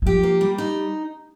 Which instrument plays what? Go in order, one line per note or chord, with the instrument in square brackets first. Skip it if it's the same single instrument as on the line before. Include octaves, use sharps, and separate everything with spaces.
[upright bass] D#3
[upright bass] F3 [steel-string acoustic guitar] G4
[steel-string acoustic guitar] A#3
G3
D#4